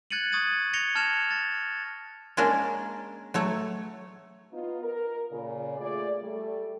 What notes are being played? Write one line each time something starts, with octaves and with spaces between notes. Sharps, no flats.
F#6 G#6 A6 C#7 D#7 F#7
C#6 D#6 G#6 A6 D#7
G#6 A#6 C#7 F7 G7
A5 F6 G#6 C#7 E7 F7
A6
G#3 A#3 C#4 D4 A#4
F#3 A3 C#5
B3 D#4 F4
A#4
A#2 C#3
A3 F4 G#4 D5
G3 A3